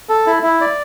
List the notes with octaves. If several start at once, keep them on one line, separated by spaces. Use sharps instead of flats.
A4
E4
E4
D5